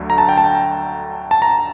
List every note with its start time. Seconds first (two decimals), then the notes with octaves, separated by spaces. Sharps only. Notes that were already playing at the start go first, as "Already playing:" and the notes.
Already playing: D2 D3 F#3
0.10 A#5
0.18 A5
0.29 G5
0.38 A5
1.31 A5
1.42 A#5